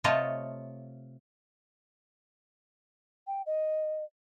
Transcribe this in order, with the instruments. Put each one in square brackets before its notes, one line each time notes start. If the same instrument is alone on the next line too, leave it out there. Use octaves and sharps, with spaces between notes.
[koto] C3 A3 F4 C#5 D#5 A5
[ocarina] G5
D#5